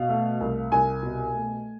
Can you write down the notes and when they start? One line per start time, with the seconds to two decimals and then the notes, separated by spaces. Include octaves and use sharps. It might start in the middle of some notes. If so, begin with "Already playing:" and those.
Already playing: B2 F5
0.09 A3
0.40 C2
0.72 C2 G#5
1.03 B2
1.34 A3